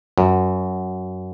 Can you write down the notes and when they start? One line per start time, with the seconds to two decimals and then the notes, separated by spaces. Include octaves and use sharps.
0.18 F#2